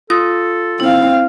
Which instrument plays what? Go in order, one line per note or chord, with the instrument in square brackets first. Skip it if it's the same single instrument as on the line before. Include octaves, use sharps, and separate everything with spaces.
[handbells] F4 [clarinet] A4 [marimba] D#6
[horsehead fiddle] C4 F5 [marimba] E4